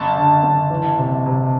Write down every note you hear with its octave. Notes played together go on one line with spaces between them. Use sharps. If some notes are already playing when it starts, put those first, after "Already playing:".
Already playing: F#1 A5
D3
F#1
E3
C3
C3